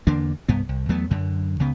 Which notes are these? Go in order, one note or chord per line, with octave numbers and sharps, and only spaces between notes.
E2 D3 A#3 D4
C2 G2 B3
C2
E2 F#3 A3 B3
F#2 D3
C#2 C#3 B3